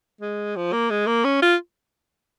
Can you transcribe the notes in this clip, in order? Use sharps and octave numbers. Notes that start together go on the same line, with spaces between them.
G#3
F3
A#3
G#3
A#3
C#4
F4